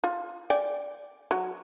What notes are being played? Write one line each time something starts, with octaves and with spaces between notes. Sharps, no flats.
F4
D5 G5 G#5
F#3